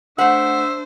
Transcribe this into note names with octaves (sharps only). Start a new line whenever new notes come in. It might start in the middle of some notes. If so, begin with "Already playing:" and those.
A3 D4 C5 E5 F#5